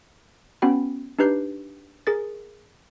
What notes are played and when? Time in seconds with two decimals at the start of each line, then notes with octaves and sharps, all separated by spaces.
0.62 B3 C#4 F#4 G5 B5
1.19 D4 D#4 G4 B4 G6 C7
2.07 G#4 A#4 A6